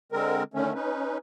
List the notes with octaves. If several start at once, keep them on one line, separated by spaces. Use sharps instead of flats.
D3 G#3 C4 A#4
D3 D#3 A3 C#4
C#4 D#4 B4